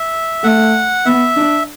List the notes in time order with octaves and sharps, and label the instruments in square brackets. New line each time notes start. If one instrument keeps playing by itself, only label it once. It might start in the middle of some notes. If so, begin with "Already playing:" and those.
Already playing: [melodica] E5
[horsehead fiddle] A3 [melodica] F#5
[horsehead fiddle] B3 [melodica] E5
[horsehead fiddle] D4